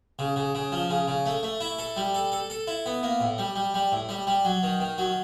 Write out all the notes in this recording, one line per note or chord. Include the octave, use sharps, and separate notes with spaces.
C#3
C#3
C#3
F3
C#3
C#3
A3
A3
E4
A4
G3
A4
A4
A4
E4
B3
A#3
A2
G3
G3
G3
A2
G3
G3
F#3
D#3
D#3
F#3